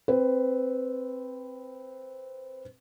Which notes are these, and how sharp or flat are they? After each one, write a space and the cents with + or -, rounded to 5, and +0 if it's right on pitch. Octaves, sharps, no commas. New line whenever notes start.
C4 +0 B4 +10